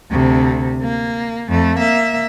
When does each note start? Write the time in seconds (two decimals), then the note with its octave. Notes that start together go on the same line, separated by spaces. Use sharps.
0.11 D2 C3
0.82 A#3
1.48 F2 A3
1.79 A#3 E5